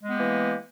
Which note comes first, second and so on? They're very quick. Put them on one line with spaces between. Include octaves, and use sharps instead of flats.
G#3 B3 G4 A#3 E3